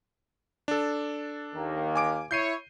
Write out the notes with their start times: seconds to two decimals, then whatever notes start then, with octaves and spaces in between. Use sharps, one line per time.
0.68 D4 A4
1.55 D#2 D#3 A#3
1.96 G#5 D6 D7
2.31 E4 C#5 G6 C7 D#7